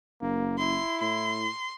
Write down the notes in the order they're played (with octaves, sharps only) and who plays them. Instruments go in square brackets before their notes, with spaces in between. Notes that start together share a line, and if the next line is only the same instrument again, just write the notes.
[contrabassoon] F#1 [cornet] A#3
[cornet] E4 [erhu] C6
[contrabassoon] A2 [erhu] C6